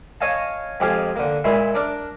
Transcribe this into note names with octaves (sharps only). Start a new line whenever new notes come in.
C#5 D#5 F5 G#5 A5
F2 G#3 G4 G#4 F5
D3 A#3
A#2 G#3 E4 C6
D4 A#4 D5